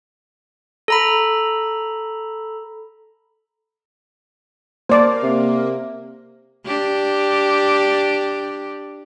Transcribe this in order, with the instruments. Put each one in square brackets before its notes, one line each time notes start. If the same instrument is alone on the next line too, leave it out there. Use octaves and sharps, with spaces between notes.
[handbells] A4 A#5 B5
[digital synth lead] A#3 [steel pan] C5 D5
[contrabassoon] C3
[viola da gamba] D4 G4